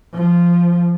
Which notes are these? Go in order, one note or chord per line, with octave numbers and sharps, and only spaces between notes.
F3